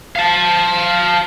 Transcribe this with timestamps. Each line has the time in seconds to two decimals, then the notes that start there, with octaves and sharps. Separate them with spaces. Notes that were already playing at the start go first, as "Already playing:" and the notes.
0.16 F5 A5